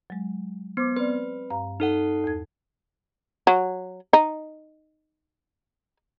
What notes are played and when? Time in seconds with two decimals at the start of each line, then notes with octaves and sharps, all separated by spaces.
0.10 F#3 G#3
0.77 B3 C5 D6
0.96 C4 B4 D5
1.50 G2 F5 A#5
1.80 D#4 A4 F#5
2.24 E2 G#6
3.47 F#3
4.13 D#4